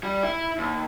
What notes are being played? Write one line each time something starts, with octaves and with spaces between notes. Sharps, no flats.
G3
E4
D#2